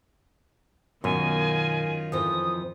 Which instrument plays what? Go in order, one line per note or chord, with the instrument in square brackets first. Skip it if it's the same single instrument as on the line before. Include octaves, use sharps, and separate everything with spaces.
[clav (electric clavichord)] F#2 [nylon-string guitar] B2 [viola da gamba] D#3 F4 [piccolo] G#5
[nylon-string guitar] F2 E3 F3 [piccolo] D#6